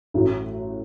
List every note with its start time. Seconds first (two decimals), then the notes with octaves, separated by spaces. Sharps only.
0.14 A1 A2 F#3